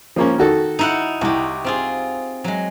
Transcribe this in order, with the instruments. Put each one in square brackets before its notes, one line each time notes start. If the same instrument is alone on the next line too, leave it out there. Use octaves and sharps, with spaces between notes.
[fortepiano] F3 A#3 C#4
D#3 F#4 A4
[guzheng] D#4 E4 F#5
[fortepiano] C2 [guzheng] F#4 G4
[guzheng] C4 F4 G#4
F#3 G#3